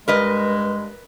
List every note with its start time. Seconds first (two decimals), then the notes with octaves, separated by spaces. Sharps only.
0.08 G2 G#3 A#4 B4 D#5